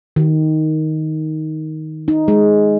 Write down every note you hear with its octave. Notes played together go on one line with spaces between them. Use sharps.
D#3
D#4
G#3